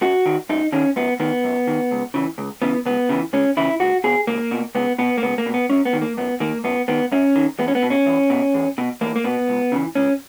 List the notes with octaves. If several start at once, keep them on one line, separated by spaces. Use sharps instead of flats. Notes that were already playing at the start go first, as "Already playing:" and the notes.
F#2 F#4
D#3
F#2 D#4
D#3 C#4
F#2 B3
D#3 B3
F#2
D#3
C#2
C#3 E3
C#2
C#3 E3 B3
C#2 B3
C#3 E3
C#2 C#4
C#3 E3 E4
C#2 F#4
B2 G#4
C#2 A#3
B2
C#2 B3
B2 B3
A#3
C#2 B3
A#3
B2
B3
F#2 C#4
B3
D#3
A#3
F#2 B3
D#3 A#3
F#2 B3
D#3 B3
F#2 C#4
D#3
E2 B3
C#4
B3
B2
C#4
E2
B2
E2
B2
E2 A#3
A#3
B2 B3
C#2
C#3 E3
C#2 C#4